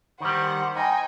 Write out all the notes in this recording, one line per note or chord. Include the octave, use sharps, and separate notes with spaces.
D#3 G3 C5 F#5
D#4 G5 G#5